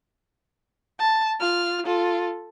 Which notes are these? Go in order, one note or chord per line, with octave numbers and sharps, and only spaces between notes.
A5
F4 F6
F4 A4